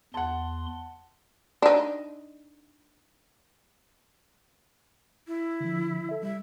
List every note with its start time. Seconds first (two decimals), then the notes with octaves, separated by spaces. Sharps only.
0.14 E2 F#5 A5 C6
1.62 D4 D#4
5.28 E4
5.60 D3 F3
6.09 A4 E5
6.23 G3 E5